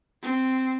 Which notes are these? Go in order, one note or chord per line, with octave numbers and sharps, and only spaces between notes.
C4